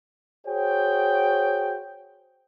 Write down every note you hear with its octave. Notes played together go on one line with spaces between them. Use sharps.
F#4 G#4 C5 C#5 G5